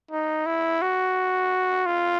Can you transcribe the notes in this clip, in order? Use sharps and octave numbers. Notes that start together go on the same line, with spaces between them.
D#4
E4
F#4
F4